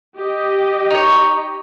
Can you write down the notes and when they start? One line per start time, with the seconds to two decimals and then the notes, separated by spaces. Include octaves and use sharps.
0.17 G4 D#5
0.90 D#4 C#5